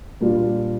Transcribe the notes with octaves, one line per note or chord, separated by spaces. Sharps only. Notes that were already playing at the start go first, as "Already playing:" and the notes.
A#2 G3 D4 F4